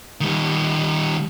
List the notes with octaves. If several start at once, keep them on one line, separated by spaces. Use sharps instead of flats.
D#3 G3